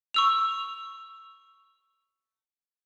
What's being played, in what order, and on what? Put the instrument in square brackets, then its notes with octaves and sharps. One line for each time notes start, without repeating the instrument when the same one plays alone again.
[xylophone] C#6 E6 F7